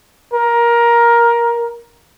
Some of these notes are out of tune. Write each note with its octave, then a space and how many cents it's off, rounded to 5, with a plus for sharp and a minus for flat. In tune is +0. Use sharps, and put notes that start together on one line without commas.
A#4 +15